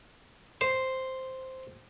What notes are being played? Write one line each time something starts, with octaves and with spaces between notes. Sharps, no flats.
C5